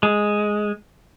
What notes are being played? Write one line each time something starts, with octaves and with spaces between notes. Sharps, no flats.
G#3